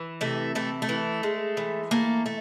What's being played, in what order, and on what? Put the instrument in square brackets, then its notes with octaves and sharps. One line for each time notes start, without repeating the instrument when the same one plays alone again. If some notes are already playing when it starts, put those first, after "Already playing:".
Already playing: [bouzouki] E3
C3 A3
E3 A3
A3
E3
G#3
E3
A3 A#3
A3